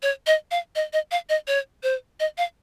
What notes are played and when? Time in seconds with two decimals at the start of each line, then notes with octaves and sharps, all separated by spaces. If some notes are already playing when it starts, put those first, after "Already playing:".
0.03 C#5
0.27 D#5
0.51 F5
0.75 D#5
0.93 D#5
1.11 F5
1.29 D#5
1.47 C#5
1.83 C5
2.20 D#5
2.38 F5